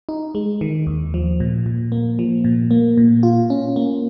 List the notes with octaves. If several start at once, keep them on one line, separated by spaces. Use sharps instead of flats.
D#4
G#3
D#3
D#2
F3
A#2
A#2
A#3
F3
A#2
A#3
A#2
F4
C#4
A#3